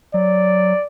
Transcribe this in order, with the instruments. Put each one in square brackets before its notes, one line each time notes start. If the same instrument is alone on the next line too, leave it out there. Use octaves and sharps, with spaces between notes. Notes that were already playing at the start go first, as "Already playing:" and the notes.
[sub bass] F#3 [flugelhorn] D5